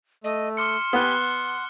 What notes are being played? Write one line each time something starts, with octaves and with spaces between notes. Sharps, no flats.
A3 D#5
C6 D6 F6 C#7
B3 G4 G#5 B5 F#6 G7
F#5